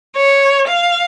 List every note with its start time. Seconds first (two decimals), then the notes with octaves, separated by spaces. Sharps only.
0.15 C#5
0.69 F5